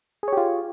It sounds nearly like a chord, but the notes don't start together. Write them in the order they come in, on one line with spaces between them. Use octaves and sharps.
G#4 C#5 G4 F4